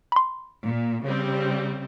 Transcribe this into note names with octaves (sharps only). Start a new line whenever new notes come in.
B5 C6
A#2
C#3 G3 C4